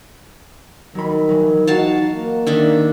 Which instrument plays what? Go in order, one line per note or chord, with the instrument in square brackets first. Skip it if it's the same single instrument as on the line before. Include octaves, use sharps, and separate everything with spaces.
[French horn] D#3 [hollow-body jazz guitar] F#3 B5
[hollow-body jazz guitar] E3 F#3
[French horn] D#4 [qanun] F#4 F5 A5
[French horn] A#3
[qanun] D#3 D4 E5